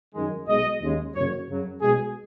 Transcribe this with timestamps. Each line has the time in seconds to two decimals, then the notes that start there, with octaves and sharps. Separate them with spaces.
0.14 F#2 D#3 G#3
0.47 B1 B2 G#3 D#5
0.80 D#2 C#3 G#3
1.14 F#1 F#2 C#3 F#3 C#5
1.48 F#2 C#3 F#3
1.81 B1 B2 G#3 G#4